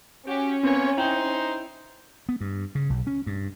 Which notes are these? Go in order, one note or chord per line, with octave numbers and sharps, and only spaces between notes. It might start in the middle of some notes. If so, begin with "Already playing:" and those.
C#4 F#4 G4
A#2 B3 C4 F4 C#5
D#4 E4 C5 G5 F#7
B3
G2
C#3
B1
C#4
G2